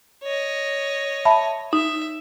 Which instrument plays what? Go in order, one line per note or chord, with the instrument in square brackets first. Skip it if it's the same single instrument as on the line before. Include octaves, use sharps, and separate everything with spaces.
[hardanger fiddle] C#5 D#5
[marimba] E5 A5 B5
[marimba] D#4 [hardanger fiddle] E5